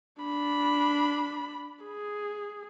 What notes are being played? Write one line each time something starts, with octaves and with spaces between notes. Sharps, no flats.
D4 B5
G#4